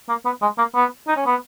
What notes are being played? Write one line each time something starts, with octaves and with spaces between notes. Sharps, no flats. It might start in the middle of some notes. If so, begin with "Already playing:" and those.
A#3
B3
G#3
A#3
B3
D#4
C#4
B3